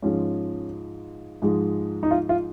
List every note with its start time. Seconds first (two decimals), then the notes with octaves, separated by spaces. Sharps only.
0.02 G#2 F3 G#3 C#4
1.42 G#2 F3 G#3
2.03 D#4
2.11 F4
2.29 F4